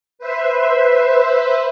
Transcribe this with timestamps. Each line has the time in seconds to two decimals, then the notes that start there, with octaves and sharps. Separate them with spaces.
0.19 B4 C5 E5